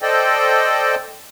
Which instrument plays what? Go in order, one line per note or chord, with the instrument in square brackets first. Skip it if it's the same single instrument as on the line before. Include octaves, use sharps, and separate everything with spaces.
[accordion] A4 C5 D5 D#5 G5